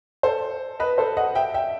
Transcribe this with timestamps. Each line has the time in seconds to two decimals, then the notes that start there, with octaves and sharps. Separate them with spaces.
0.23 A4 C5
0.80 B4 D#5
0.98 A4 C5
1.17 D#5 F#5
1.35 E5 G5
1.54 E5 G5